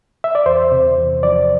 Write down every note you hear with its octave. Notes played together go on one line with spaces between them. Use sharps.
E5
D5
E2 C5
C3
E2
F3 D5